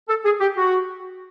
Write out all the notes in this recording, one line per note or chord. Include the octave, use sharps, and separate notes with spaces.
A4
G#4
G4
F#4